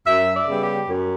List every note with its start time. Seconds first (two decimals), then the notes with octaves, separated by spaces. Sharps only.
0.07 F#2 E5
0.34 D5
0.47 C#3 G3 B3
0.61 G4
0.89 F#2